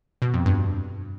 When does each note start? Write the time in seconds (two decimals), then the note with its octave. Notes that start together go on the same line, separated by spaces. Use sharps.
0.22 B2
0.34 F2
0.46 G2